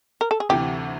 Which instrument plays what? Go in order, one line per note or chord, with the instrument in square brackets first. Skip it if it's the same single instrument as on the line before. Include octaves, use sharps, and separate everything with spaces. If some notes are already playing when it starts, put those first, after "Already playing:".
[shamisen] A#4
A4
G#4
[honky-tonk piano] D2 C3 E3 [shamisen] G4